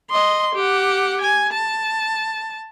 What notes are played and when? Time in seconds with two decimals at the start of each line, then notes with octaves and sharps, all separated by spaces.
0.11 D#5 C6
0.54 G4 F#5
1.22 G#5
1.53 A5